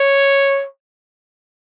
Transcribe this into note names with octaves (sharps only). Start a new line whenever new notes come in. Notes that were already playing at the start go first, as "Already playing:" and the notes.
Already playing: C#5